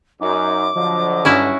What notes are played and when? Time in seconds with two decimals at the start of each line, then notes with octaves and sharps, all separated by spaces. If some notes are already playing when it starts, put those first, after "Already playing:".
0.21 F#2 D#4 D6
0.75 D3 F3 F#3 D#5
1.25 G2 C#4 E4 F#4